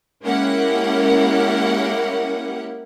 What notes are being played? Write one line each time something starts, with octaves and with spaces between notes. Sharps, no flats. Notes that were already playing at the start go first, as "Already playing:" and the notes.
G#3 A#3 C#4 E4 G4 F#5